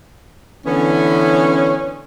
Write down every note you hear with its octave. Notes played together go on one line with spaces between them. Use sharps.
D3 E3 B3 C#4